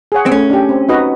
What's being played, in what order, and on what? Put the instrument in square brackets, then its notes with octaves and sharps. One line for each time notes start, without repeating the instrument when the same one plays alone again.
[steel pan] G#4 C#5 F#5
[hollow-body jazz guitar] C4
[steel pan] A3 [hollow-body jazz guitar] C#4
[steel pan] D4 G4
C4
D#4 F#4 B4 D#5